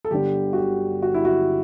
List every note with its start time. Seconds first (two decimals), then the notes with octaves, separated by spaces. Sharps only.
0.05 A4
0.11 G1 G2 D3 G3 G4
0.53 F#4
0.57 G4
1.02 F#4
1.14 E4
1.25 F#4